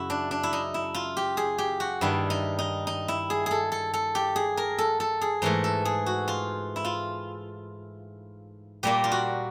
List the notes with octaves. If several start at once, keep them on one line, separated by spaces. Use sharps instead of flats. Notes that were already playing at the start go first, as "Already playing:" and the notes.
Already playing: F#2 C#3 E4 F#4
D4
D4
E4
D#4
E4
F4
G4
G#4
G4
F#4
G2 D#3 G3 E4
D#4
D#4
D#4
E4
G#4
G#4 A4
A4
A4
G4
G#4
A#4
A4
A4
G#4
G#2 E3 A3 A#4
A4
G#4
F#4
F4
E4
F4
A#2 G3 A#3 G4
F4
F#4